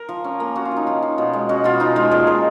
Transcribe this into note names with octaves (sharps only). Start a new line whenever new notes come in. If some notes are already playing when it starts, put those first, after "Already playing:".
Already playing: A#4
F3
C#4
A#3
C#4 F#4
F4
F3
D#4
F3 F4
F3
B2
G#3
C#4 F#4
B2 F4
F3 D#4
G#3 F4
A#2 G#4
G#3 A#4